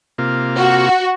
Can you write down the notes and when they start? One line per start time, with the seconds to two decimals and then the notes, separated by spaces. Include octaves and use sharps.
0.18 C3 A#3 F4
0.56 F#4